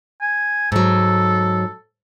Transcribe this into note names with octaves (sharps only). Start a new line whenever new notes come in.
G#5
G#2 F#3 A4